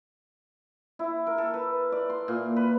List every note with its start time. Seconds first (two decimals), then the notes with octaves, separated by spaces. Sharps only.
0.99 E4
1.27 A#4
1.38 A4
1.54 B4
1.92 D5
2.10 C6
2.28 A#2
2.56 B4